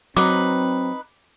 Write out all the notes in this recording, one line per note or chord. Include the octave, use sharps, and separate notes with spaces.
F#3 C4 D#4 B4 D6